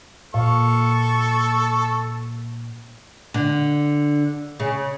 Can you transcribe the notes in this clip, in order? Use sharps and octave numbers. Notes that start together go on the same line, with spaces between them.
A#2 A4 F5 C#6
D3
C#3